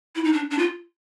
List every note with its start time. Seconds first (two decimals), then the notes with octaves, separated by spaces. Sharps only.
0.16 E4
0.24 D#4
0.33 D4
0.51 D4
0.59 F4